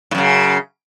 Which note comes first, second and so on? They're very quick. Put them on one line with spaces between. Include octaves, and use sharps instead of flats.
A2 F#2 C#3